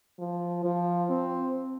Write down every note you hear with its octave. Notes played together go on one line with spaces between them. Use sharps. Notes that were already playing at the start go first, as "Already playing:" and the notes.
F3
F3
C4